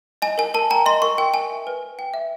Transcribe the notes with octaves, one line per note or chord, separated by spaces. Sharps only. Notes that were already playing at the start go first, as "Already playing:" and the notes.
D#5 G#5
A#4 G#5
A#4 A5
G5 A#5
D#5 C6
A#4 C#6
A#4 G5
G5 G#5
E5
B4
B4
G5
E5